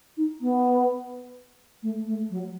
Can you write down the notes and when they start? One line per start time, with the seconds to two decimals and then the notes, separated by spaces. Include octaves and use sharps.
0.17 D#4
0.41 B3
1.82 A3
2.06 A3
2.30 F#3